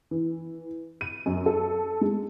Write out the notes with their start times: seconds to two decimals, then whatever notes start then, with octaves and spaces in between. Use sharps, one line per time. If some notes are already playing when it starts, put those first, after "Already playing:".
0.11 E3
1.01 D#7
1.26 F#2
1.46 A4
2.01 G#3